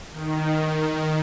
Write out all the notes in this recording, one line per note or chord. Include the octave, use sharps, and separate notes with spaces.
D#3